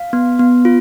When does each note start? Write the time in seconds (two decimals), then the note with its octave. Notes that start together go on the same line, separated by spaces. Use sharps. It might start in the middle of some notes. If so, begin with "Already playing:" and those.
Already playing: F5
0.13 B3
0.39 B3
0.65 F4